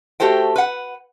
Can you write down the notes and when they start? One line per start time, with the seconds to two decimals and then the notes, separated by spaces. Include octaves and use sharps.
0.20 A3 F#4 G4 A4 C5 G5
0.56 B4 F#5